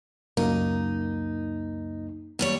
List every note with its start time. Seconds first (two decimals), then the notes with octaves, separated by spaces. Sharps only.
0.37 C#2 F#2 A#3 D#4
2.39 D#2 G3 C#5